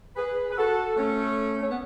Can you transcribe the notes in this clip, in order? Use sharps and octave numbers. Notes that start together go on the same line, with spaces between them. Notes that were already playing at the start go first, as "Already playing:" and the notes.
G#4 B4
B4
F#4 A4
A3 C#4
C#4
B3